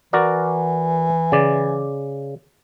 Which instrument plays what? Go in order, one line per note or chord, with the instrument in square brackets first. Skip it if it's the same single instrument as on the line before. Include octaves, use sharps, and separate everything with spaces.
[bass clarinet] E3 [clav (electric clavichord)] F#4 A#4 D5
[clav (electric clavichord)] C#3 D5